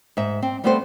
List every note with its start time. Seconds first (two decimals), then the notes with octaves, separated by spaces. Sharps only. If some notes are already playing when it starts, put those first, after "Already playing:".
0.17 G#2 E5
0.42 C4
0.64 G3 A3 B3 C4 A4 C5